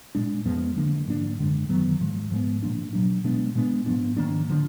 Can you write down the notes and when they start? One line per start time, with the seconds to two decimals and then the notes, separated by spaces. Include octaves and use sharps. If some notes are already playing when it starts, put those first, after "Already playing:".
0.15 A#2 G#3 D4
0.45 F2 F3 G#3 B3
0.76 D3 F3 A#3 D4
1.07 G#2 F3 A#3 D4
1.39 F#2 D3 G#3 D4
1.69 F#2 D#3 F#3 B3
2.00 G#2 F3 G#3
2.31 G#2 F3 G#3 B3
2.63 A#2 F3 A#3 D4
2.93 B2 F#3 D4
3.24 B2 G#3 B3 D4
3.55 A#2 G#3 B3 D4
3.86 G#2 F3 B3 D4
4.17 G#2 D#3 A#3 D4
4.48 D3 F3 B3 D4